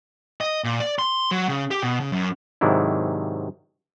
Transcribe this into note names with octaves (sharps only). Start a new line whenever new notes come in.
D#5
A#2
D5
C6
F#3
C#3
G4
B2
C#3
F#2
G#2 C3 D#3 F#3 D4 E4